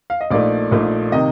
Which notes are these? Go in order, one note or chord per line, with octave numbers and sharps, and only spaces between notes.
F5
D#5
A#1 A#2 A3 D#4 D5
A#1 A#2 A3 D#4
C3 D#3 D#5